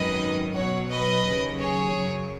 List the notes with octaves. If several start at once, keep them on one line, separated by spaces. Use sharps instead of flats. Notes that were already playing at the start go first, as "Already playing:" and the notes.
Already playing: G#1 F#2 D#3 F#3 B4 D#5
B1 B2 F#3 C#5 F#5
B4 D#5
D#2 C#3 F#3
G#4 C#5
F#2 C#3 F#3